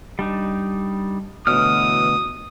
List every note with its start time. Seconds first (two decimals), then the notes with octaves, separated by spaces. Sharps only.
0.19 G3 D4 D#4
1.47 D2 B2 E3 C#5 D#6 F6